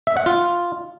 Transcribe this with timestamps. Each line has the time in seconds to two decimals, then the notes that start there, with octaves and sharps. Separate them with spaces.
0.07 E5
0.17 F#5
0.26 F4